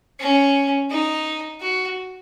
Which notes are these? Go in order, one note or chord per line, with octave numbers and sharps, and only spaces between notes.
C#4
D#4
F#4